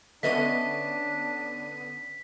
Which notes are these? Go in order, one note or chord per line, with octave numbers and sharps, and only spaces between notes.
D3 B3 C#4 D4 D#5 E5 B6 D#7